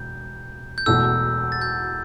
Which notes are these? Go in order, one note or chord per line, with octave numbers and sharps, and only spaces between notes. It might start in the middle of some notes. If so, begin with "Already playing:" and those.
Already playing: E1 G6
G6
E1 E2 B2 A3 E6
A6
G6